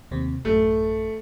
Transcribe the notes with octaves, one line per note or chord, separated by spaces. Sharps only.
D#2 C3 C4
A1 F#2 A3